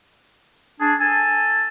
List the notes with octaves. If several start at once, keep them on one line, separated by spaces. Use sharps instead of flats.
D4 G#4
A4 G#5